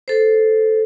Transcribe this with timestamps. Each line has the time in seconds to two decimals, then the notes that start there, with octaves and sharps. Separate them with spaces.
0.08 A4 C5